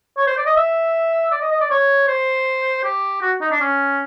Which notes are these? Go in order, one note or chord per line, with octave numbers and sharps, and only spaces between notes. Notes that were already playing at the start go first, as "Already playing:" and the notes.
C#5
C5
D5
D#5
E5
D5
D#5
D#5
D5
C#5
C5
G4
F#4
D#4
D4
C#4